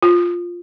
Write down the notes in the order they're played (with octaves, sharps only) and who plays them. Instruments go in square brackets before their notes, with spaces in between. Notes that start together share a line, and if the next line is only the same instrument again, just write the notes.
[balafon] F4